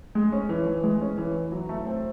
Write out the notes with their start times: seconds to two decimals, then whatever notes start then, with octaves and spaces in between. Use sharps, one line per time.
0.15 G#3
0.32 C#4
0.49 E3
0.67 E3
0.83 G#3
1.01 C#4
1.18 E3
1.35 E3
1.52 F#3
1.69 A3
1.86 C4